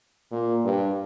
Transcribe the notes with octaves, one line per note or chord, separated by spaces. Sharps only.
A#2
G2